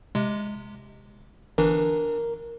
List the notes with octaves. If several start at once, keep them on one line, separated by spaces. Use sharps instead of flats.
C3 G#3
G1 E3 D4 A#4